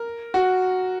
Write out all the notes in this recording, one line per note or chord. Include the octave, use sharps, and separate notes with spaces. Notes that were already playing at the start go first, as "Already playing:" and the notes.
Already playing: A#4
F#4